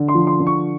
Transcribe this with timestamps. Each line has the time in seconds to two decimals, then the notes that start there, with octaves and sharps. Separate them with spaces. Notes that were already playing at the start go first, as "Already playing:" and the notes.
Already playing: D3
0.08 C6
0.14 F3
0.27 C6
0.40 D3
0.47 C#6